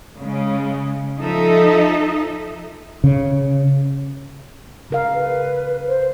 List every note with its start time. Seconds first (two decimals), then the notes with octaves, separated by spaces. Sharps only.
0.19 C#3 G#3
1.17 F3 D#4 A4 E5
3.04 C#3
4.90 C#3 A#4 F5
5.12 B4
5.87 C5